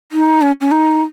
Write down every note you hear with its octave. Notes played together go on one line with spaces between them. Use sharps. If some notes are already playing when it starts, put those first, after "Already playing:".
D#4
C#4
C#4
D#4